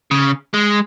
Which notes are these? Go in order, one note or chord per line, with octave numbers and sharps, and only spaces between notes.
C#3
G#3